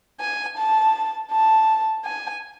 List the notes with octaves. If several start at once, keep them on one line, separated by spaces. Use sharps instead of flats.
G#5
A5
A5
G#5